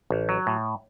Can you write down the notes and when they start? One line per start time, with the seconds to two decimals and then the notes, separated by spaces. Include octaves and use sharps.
0.10 A1
0.29 F#3
0.47 A2